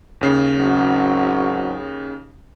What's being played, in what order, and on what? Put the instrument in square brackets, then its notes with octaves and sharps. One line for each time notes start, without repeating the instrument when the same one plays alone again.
[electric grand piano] D#2 C#3 C7
[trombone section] G#1 F#3 C#4